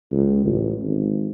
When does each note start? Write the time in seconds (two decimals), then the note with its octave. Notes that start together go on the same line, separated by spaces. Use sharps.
0.12 C#2
0.45 A1
0.82 G#1